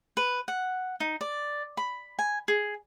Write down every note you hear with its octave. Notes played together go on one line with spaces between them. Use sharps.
B4
F#5
D#4
D5
B5
G#5
G#4